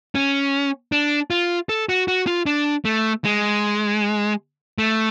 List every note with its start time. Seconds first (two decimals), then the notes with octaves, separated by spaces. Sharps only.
0.15 C#4
0.92 D4
1.30 F4
1.69 A4
1.89 F#4
2.08 F#4
2.27 F4
2.46 D4
2.85 A3
3.24 G#3
4.78 A3